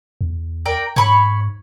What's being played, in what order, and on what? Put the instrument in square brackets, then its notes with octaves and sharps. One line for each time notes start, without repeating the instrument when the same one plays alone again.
[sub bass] E2
[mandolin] A#4 D5 G5
[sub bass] G#2 [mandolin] C#5 B5 C#6